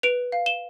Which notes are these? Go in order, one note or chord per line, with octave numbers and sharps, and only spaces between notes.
B4 D7 F7
F5
E7 G7